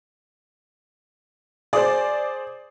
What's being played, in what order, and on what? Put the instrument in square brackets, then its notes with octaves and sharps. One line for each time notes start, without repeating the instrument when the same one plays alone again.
[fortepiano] G#4 C5 [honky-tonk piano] D5